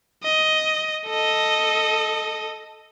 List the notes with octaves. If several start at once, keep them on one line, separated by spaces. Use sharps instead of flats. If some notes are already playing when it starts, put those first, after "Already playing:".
D#5
A4 D#5